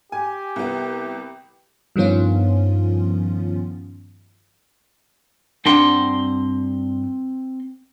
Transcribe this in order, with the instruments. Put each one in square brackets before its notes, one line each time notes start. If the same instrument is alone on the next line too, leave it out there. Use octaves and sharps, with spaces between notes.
[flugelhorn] G4 [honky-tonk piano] G#5
[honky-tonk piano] C2 B3
[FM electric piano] G2 D#3 F3 B3 C#4 F4
[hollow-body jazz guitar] G2 D4 F#5 [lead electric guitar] C4 C6